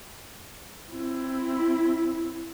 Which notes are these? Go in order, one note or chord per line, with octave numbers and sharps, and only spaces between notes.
C4 E4